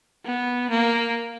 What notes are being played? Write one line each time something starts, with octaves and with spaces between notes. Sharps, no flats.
B3
A#3